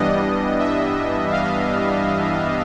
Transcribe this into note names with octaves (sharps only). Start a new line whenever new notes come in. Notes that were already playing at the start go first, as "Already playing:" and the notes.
Already playing: G2 E3 G3 B3 D4 D#5
E5
F5